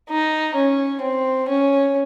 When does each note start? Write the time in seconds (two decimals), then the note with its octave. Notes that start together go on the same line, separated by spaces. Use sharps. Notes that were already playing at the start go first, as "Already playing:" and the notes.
0.10 D#4
0.55 C#4
1.02 C4
1.48 C#4